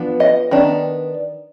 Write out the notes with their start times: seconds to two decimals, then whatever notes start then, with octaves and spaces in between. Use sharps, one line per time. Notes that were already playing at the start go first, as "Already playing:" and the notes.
Already playing: F3 B3 D4
0.20 D#5
0.51 D#3 B3 D4